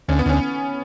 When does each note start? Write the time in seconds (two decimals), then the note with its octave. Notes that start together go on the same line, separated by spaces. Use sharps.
0.09 D2 C#4
0.19 B3
0.26 D2 C#4